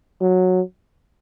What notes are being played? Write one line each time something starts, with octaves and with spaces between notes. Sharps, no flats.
F#3